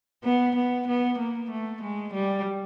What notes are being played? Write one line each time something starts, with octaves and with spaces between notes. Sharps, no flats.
B3
B3
B3
A#3
A3
G#3
G3